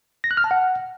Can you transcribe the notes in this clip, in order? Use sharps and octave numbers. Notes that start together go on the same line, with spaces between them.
A#6
F#6
F6
A5
F#5